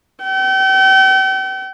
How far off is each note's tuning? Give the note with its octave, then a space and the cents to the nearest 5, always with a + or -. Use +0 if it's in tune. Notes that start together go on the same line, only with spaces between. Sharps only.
G5 -40